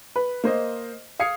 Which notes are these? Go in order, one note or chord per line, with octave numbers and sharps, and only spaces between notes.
B4
A#3 C5 D#5
F5 D#6 G#6 C7 C#7